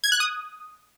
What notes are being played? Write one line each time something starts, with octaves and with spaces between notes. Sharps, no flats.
G#6
F#6
D#6